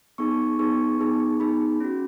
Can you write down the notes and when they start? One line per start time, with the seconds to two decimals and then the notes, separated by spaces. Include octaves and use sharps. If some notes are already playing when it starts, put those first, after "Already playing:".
0.18 B3 D#4 G#4 C#6
0.59 B3 D#4 G#4 C#6
0.99 B3 D#4 G#4
1.40 B3 D#4 G#4 B5
1.80 C#4 F#4